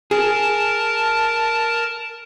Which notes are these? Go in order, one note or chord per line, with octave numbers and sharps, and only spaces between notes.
G#4 A#4 A5